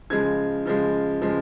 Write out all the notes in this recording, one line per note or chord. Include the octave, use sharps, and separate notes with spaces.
C#3 F3 G#3 G#6
C#3 F3 G#3
C#3 F3 G#3